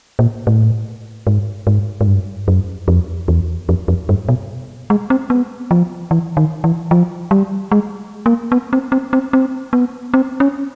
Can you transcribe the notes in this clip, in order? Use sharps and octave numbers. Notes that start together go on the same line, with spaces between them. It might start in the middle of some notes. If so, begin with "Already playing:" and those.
A#2
A2
G#2
G#2
G#2
G2
F#2
F2
E2
F2
F2
G2
B2
G#3
C4
B3
F3
E3
D#3
E3
F3
G3
G#3
A#3
B3
C4
C4
C4
C4
B3
C4
C#4